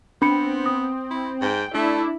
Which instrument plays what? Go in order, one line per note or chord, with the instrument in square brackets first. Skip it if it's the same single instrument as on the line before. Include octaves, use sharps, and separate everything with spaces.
[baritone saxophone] B3 [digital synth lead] C4 [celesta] D4 B5 C#7
[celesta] D#6
[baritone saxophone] E4
[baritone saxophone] G#2 [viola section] G5
[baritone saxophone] A3 [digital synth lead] D4 [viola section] E4